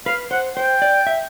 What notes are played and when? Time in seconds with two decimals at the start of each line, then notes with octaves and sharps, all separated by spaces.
0.06 B4 F5
0.31 C5 F#5
0.56 C5 G5
0.82 D5
1.07 E5